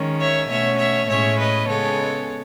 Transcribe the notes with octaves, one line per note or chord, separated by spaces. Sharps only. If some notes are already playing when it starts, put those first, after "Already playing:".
Already playing: D#3 G#3 C#4
C#5 E5
B2 A3 C#4 C#5 E5
C#5 E5
A2 G#3 C#4 C#5 E5
B4 D#5
C#3 G#3 B3 A4 C#5